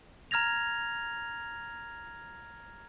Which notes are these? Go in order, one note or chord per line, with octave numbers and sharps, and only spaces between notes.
A#5 F6 G#6 A#6 F7